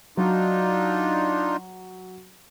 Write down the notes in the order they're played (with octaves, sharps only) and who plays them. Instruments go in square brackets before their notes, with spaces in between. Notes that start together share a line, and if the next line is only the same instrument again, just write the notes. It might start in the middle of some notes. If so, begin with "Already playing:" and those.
[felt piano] F#3 [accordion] D4 D#4 F4